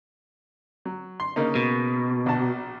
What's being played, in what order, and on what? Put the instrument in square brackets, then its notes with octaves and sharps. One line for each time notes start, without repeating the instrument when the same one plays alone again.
[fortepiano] F#3
C6
C#3 A#3 D#4
[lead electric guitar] B2
[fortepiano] A#1 F#4 A5